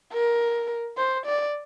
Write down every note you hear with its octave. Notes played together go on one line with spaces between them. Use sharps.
A#4
C5
D5